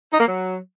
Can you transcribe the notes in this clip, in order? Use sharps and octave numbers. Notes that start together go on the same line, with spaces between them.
D#4
A#3
F#3